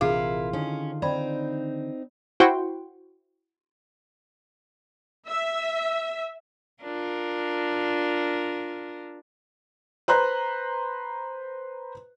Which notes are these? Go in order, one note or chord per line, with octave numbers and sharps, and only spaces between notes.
A#1 C3 E3 E4 F4 G#4 A#4
D3 D#3 C#4
C4 D#4 D5 B5
E4 F#4 C5 F#5 G5 C6
E5
D4 F4 A#4
B4 C5 A#5 F#6